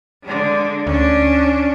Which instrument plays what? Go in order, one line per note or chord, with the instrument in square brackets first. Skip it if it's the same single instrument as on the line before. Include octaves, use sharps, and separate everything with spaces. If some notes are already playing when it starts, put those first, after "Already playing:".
[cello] D3 G#3
[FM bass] D2 [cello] C#4 D4